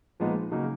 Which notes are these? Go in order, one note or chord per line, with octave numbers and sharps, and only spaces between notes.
A#2 F3 G#3 B3 D#4
C#3 F#3 A#3 D#4